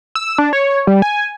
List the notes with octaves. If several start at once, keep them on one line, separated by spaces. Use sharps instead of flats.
E6
D4
C#5
G3
G#5